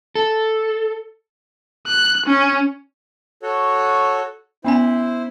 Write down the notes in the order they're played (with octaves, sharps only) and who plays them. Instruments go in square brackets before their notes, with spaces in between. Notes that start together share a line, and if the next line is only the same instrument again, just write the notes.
[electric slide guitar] A4
[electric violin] F#6
C#4
[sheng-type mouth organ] F#4 A4 C#5
[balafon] B3 C#4 G#5 [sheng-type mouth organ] E4 C5